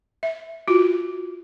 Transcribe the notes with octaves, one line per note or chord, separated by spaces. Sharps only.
E5
F4 F#4